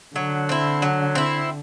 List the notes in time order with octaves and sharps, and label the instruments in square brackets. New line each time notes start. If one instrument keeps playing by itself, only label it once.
[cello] D3 [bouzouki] F#3
[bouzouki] C4 E4
F#3
C4 E4